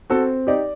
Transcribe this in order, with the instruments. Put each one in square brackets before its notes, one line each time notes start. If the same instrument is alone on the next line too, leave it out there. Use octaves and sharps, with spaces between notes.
[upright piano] C4 [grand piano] F#4 A4
[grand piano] D#4 G4 [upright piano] D5